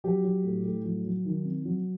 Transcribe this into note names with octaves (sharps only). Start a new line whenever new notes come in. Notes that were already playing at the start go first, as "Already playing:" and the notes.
F#3 G4
F#3
A2
A2
F#3
F#3
D#3
C3
F#3